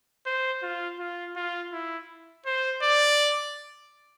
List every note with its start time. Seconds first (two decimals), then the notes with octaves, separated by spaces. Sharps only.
0.26 C5
0.63 F4
1.00 F4
1.36 F4
1.73 E4
2.46 C5
2.83 D5